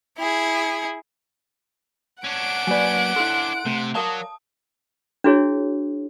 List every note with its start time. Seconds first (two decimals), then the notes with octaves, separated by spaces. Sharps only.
0.18 E4 G#4
2.24 C#4 D4 F#5 D7
2.67 F#3 A#3 B4 D5 G#5
3.16 E4 A4 C6 F#6
3.66 C3 A3
3.95 F#3 A#4 D5 F5 A5 D#6
5.24 D4 E4 F#4 G#4 C#5